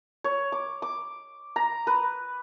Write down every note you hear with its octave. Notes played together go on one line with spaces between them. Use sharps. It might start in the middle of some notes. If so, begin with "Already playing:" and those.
C#5
D6
D6
A#5
B4